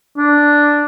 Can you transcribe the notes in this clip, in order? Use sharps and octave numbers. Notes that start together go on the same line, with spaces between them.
D4